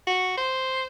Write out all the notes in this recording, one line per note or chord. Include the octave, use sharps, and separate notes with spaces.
F#4
C5